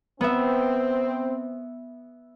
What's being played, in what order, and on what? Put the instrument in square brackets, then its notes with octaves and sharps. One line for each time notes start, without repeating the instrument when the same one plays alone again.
[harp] B3 E5 [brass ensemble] C4